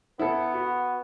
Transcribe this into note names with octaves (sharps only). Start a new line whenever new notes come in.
B3 E4 A4
F#4